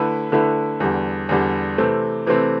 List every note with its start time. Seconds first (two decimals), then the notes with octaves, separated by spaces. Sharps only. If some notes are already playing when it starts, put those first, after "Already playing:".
Already playing: D3 A3 E4 B4
0.32 D3 A3 E4 B4
0.80 E2 D3 G3
1.29 E2 D3 G3
1.78 C3 E3 A3 C4
2.27 C3 E3 A3 C4